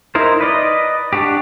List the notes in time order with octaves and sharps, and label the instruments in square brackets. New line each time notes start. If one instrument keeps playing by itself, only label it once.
[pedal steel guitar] D#4 E4 A#4 C5
B4 D5 D#5
D4 F#4 G4